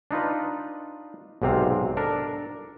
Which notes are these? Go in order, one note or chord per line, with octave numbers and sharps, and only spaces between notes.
D4 D#4 F4 B4
B1 G#2 C3 C4 F5
D4 A4 A#4